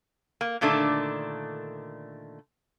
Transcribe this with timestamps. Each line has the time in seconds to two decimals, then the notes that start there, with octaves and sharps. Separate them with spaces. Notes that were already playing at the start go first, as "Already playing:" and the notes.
0.41 A#3
0.61 A#2 D3 D#3 A3 D4